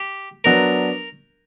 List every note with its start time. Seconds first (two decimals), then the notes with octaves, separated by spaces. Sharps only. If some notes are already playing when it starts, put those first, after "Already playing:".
Already playing: G4
0.44 F#3 B3 D4 A#4